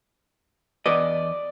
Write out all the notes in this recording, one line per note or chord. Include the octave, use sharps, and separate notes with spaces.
E2 B4 D5 D#5